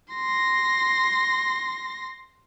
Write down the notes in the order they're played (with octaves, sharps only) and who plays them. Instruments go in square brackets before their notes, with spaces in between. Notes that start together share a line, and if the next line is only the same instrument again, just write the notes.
[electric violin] C6 A#6